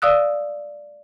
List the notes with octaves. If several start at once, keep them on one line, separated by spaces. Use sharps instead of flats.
D5 F5 D#6 E6 F#6